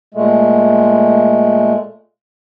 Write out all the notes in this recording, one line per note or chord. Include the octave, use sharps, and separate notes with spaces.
A#2 G#3 A3